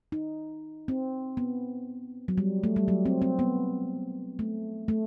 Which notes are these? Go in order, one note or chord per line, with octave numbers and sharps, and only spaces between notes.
D#4
C4
B3
F#3
G3
A3
G3
F#3
C4
C4
B3
A3
A3